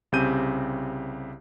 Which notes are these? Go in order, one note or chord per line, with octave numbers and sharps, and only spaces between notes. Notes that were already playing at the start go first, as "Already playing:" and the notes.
C2 C#3 C4 G4 G6 D#7